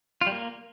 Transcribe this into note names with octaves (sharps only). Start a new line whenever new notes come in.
F4
G3
A#3